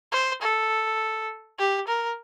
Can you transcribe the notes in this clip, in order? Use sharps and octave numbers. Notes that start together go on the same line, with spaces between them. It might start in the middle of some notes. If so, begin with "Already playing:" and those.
C5
A4
G4
A#4